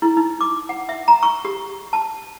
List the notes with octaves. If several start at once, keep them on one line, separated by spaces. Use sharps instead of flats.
E4
D#4
D6
F#5
E5
A#5
C#6
G4
A5